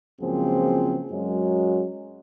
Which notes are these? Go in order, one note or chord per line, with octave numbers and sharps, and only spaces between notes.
C#2 F#2 F3 A#3 C4 G#4
F#2 F#3 G#3